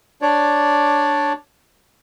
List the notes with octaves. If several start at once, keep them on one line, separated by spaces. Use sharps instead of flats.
D4 C#5 D5